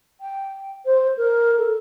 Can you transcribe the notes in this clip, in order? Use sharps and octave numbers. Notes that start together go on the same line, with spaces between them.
G5
C5
A#4
A4